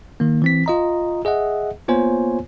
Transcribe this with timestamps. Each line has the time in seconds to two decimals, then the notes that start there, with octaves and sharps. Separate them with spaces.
0.20 D#3 A#3
0.42 E3 C4 B6
0.66 F4 D#5 A#5
1.25 G#4 D#5 E5 F#5
1.88 A#3 B3 F4 C5 C#5 G#5